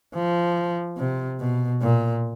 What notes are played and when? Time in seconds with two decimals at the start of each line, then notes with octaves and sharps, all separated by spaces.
0.14 F3
0.98 C3
1.40 B2
1.82 A#2